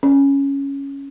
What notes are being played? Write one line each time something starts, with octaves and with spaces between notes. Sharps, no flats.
C#4